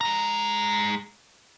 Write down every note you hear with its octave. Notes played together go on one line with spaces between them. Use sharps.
G#3 A#5